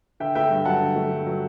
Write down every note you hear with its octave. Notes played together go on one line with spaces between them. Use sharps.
D3 E5 G5
A3 E5 G5
G2
F#3 F#5 A5
D3
A3
G2
F#3